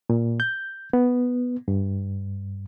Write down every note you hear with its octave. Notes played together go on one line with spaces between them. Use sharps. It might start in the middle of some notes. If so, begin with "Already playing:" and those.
A#2
G6
B3
G2